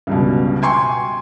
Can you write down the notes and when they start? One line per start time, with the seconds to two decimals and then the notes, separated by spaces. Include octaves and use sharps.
0.07 C#2 G2 B2
0.62 G5 G#5 C6 C#6